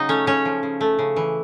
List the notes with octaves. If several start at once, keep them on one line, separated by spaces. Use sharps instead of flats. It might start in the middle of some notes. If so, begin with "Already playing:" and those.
Already playing: C#3 F#3 D#4 D#5
A3 C#4 C#5
C#3 C#4 C#5
F3
C#3
A3
C#3
E3